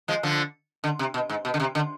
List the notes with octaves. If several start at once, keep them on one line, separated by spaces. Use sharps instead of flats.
F3 G#3
D3 F3
D3
C3
B2
G#2
B2
D3
C3
D3